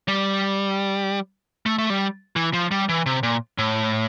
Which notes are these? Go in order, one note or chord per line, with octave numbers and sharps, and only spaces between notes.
G3
A3
A3
G3
E3
F3
G3
E3
C3
A#2
A2